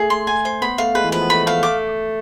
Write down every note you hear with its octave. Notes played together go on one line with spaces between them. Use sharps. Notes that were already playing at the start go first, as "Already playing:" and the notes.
Already playing: A3 G#4
C6
G#5
C5
B3 B5
A3 F5
G#3 B4
E3
F3 B4
B3
A3 B5
A3 F5
A3 D6